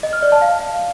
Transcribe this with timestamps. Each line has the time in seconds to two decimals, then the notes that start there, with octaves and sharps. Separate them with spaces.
0.03 D#5
0.13 F6
0.22 D5
0.32 A5
0.42 F5